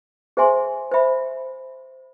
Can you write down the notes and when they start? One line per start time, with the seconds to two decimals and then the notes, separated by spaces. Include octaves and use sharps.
0.37 G#4 C5 E5 G#5 C6
0.91 C5 E5 B5